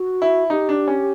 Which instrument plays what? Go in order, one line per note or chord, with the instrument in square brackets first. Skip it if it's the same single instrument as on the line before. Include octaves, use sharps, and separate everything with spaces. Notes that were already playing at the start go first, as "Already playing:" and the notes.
Already playing: [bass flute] F#4
[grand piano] E4
[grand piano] D#4 [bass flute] G4
[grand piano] D4
C#4